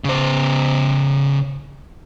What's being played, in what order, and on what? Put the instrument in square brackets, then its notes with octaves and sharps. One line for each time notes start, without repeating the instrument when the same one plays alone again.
[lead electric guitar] C#3 C5